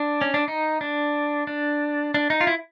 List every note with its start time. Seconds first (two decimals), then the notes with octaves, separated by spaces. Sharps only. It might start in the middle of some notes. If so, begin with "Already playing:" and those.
Already playing: D4
0.21 C#4
0.34 D4
0.48 D#4
0.81 D4
1.47 D4
2.14 D4
2.30 D#4
2.41 F4
2.47 E4